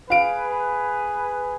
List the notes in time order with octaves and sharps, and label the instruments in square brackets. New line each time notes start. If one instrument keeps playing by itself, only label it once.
[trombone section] G#4 B4 [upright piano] F5 D7